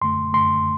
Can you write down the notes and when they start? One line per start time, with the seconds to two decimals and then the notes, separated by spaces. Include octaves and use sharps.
0.01 F#2 D3 A3 C6
0.33 F#2 D3 A3 C6